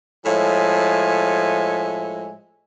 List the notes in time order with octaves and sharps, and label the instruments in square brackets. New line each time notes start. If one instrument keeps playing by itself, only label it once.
[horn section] A2 F3 G#3 C#5 E5 G#5